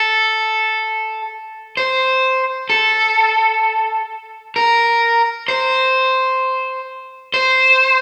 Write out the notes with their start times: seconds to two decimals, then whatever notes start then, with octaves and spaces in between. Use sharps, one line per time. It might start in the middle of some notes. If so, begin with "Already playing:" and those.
Already playing: A4
1.77 C5
2.70 A4
4.56 A#4
5.48 C5
7.34 C5